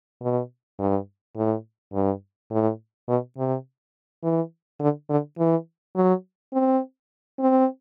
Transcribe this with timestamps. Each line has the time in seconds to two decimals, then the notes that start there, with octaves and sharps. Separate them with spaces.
0.22 B2
0.79 G2
1.37 A2
1.94 G2
2.51 A2
3.09 B2
3.37 C3
4.24 E3
4.81 D3
5.10 D3
5.38 E3
5.96 F#3
6.53 C4
7.39 C4